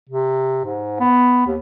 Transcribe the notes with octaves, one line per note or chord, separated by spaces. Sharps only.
C3
G#2
B3
D#2